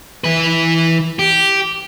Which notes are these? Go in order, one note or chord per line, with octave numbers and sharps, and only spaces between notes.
E3 B4
G4